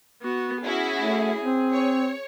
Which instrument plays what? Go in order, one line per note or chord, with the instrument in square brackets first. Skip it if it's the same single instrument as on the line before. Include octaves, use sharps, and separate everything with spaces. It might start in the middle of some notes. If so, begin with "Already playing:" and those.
[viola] B3 F#4
[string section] C#4 E4 F#4 [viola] G#4
[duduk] A3
C4
[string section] C#5